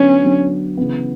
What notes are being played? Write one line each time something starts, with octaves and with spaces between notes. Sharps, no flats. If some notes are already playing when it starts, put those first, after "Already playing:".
Already playing: D3 F#3 B3 C#4 D4
D3 F#3 B3 D4
C#3 E3 B3